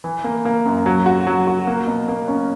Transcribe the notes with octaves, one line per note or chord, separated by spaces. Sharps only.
E3
A#3
A#3
F#2
F#3
F#4
F#3
F#4
A#3
B2
A#3
C#4